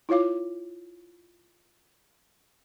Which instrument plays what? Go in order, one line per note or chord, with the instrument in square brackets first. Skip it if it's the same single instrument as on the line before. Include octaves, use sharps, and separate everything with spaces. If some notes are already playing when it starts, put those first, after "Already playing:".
[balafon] E4 F4 C#5 F5 D6